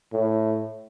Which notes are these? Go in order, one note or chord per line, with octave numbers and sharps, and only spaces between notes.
A2